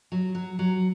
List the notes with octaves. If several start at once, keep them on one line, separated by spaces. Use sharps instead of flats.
F#3
F#3
F#3